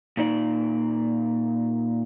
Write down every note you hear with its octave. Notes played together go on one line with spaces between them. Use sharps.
A#2 D#4 D5